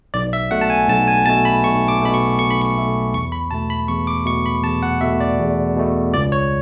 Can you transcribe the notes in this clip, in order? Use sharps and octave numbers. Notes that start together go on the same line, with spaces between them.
B1 D5
E5
B2 A3 F#5
A5
G#5
B1 A5
G#5
B2 A3 A5
B5
B1 C#6
D6
B2 A3 B5
C#6
B1 C#6
B5
C#6
B2 A3
E2 C#6
B5
B2 A3 A5
B5
E2 C#6
D6
B2 A3 C#6
B5
E2 A5
F#5
B2 A3 E5
D5
E2
B2 A3
C#2 D5
C#5